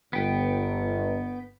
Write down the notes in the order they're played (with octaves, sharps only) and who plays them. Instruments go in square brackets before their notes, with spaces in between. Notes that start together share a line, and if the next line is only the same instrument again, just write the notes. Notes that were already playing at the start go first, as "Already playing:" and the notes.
[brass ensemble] G1 [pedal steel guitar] B3 G5